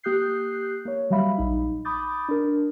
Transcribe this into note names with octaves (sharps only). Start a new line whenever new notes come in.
A#3 G4 D#6 F#6 G6 C7
A#3 C#5
F#3 G3 E5 F5 B5
A#1 D#4
B5 D6 D#6 G6 A6
D4 A#4